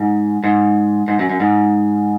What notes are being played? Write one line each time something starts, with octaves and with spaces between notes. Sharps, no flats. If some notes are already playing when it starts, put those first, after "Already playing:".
Already playing: G#2
G#2
G#2
F#2
F#2
G#2